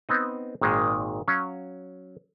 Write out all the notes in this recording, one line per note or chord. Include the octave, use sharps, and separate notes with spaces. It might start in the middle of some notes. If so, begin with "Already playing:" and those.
B3 C4 D#4
G#1 A#2 D#3 G#3
F#3 C#4 F5